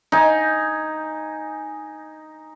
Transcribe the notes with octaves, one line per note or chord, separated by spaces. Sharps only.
D#4 G#5